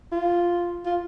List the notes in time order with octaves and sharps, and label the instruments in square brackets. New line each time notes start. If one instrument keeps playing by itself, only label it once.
[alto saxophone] F4
F4